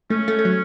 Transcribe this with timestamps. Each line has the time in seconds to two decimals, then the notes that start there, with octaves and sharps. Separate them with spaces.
0.10 A3 C#4
0.28 A3
0.39 A3
0.45 F#3